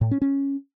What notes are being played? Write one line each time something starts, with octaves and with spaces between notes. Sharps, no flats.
A2
C#4
C#4